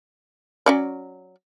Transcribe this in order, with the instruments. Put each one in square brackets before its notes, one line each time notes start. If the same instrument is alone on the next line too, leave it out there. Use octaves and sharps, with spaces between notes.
[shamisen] F#3 C#4 D5